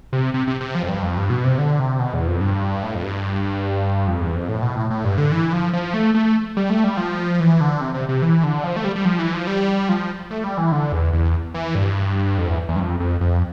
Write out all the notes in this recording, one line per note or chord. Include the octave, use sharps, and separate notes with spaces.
C3
C3
C3
C3
F3
F2
G2
F2
G2
B2
C3
D3
C3
B2
E2
F2
G2
A2
F2
G2
F2
E2
F2
A2
B2
A2
A2
G2
D3
E3
F3
F3
A3
A3
G3
A3
G3
F3
E3
D3
C3
C3
C3
E3
D3
F3
A3
G3
G3
F3
E3
F3
G3
F3
A3
G3
E3
D3
E2
E2
E3
G2
F2
E2
E2
G2
F2
F2
F2